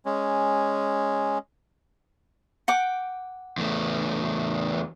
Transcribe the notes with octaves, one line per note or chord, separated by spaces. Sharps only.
G#3 C#4
F#5 G5 D6
E2 A3